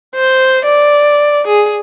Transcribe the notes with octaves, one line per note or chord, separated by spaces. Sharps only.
C5
D5
G#4